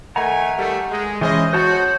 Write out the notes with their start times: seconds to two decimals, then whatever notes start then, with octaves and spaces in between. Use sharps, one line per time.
0.16 D#3 A3 F#5 G#5 A#5
0.57 D#3 G3 A3
0.90 G#3
1.21 E3 G#3 C#4 G#4 C5 D#5
1.53 F#4 C5 C#5 A5